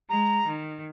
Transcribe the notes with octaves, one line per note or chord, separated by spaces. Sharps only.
G#3 A#5
D#3